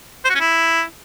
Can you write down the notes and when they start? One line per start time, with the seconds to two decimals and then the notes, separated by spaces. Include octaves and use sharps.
0.25 C5
0.30 F#4
0.35 C#4
0.40 E4